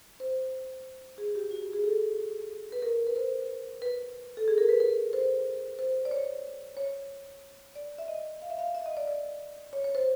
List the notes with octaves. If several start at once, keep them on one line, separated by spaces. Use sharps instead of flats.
C5
G#4
G4
F#4
G4
G#4
A4
B4
A#4
B4
C5
B4
A4
G#4
A#4
B4
B4
C5
C5
D5
C#5
C#5
D5
E5
D#5
F5
E5
F5
E5
D#5
D5
D5
C#5
C#5
C5